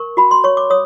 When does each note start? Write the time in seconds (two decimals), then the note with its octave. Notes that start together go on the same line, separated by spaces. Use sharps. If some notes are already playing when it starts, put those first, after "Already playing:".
Already playing: A#4 C#6
0.17 F#4 B5
0.31 C6
0.44 C#5 C#6
0.57 D6
0.70 C#5 D#6